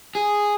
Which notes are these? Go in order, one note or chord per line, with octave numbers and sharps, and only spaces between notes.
G#4